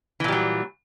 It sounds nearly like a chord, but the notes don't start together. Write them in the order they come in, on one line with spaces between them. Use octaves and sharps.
E3 A#2 G3 F#3